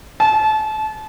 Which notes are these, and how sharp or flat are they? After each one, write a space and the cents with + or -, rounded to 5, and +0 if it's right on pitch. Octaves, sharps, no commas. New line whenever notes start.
A5 -30